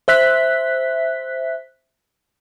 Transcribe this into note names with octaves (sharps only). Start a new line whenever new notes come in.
C5 E5 F#6 B6